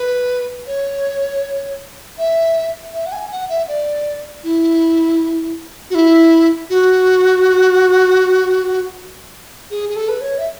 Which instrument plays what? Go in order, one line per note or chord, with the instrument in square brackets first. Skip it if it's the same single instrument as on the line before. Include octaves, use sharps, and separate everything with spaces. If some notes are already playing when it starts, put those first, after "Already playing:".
Already playing: [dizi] B4
C#5
E5
E5
F#5
G#5
F#5
E5
D5
E4
F#4
E4
F#4
G#4
G#4
A4
B4
C#5
E5